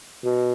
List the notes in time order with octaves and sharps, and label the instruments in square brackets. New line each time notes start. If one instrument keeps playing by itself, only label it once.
[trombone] B2